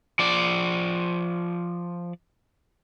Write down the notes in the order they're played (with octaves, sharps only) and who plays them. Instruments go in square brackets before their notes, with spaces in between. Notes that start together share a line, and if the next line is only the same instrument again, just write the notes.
[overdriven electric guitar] F3 D5